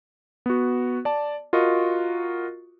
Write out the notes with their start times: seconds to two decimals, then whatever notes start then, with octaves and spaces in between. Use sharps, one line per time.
0.46 B3 F#4
1.05 D5 A5
1.53 F4 F#4 A#4 D#5 C#6